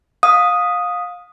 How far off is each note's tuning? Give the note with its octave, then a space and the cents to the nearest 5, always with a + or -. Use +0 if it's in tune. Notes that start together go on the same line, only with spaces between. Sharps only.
F5 +25 D#6 +0